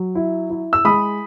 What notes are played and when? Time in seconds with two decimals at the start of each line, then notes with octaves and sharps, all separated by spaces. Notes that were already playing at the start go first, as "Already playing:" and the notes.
Already playing: F#3
0.15 E4
0.50 E4
0.73 E6
0.85 G#3 B5 D#6